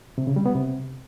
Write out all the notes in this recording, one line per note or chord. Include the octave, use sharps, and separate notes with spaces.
C3
C#3
G3
B3
C3